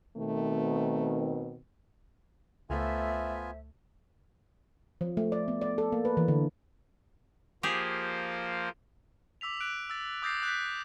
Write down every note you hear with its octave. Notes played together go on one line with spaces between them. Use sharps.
B2 D#3 A3 C4
C#2 A3 B3 F4 C5 E5 G#5
F3
A3
D5
B3
D5
A4
A#3
B4
E3
D3
F3 A#3 G4 G#4 C5
D6 E6 B6 F7
F#6 D7
E6 A6
D6 D#6 G6 A6 A#6 C7
F#6 G6 B6